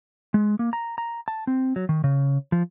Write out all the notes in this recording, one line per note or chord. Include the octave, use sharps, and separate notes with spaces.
G#3
A#3
A#5
A#5
A5
C4
F#3
D#3
C#3
F3